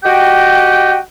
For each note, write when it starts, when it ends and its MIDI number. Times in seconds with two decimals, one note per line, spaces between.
0.04 0.98 66
0.04 0.98 67
0.04 0.98 75
0.04 0.98 79